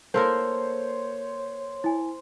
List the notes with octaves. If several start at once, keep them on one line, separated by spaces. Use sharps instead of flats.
A#3 A4 A#4 C5 C#5
E4 G#5